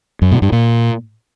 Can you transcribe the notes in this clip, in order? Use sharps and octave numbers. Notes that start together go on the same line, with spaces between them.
F#2
B2
G2
A#2